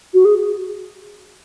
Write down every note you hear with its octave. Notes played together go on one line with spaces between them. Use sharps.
F#4
G#4